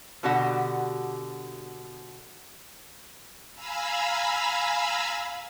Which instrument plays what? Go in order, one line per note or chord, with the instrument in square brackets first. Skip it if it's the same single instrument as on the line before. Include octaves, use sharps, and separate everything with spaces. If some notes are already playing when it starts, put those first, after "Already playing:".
[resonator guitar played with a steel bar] B2 D3 F#4 G4 F#5
[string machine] F5 G#5 A#5 B5 E6